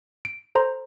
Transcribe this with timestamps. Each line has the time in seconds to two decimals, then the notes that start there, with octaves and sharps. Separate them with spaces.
0.25 D7
0.55 A4 C5 A#5 C6